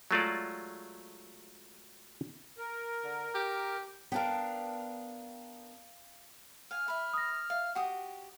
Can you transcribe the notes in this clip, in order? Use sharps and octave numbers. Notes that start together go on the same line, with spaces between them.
F#3 G#3 A3 F4 F#4 D5
A#4
D3
G4
B3 D4 A#4 F5 G5
F5 G#5 F6
B4 E5
D#6 A#6
E5 F5
F#4 G4 F#5 G5 D#6